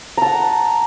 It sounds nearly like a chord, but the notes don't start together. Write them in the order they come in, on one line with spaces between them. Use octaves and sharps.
A#5 A5 F#5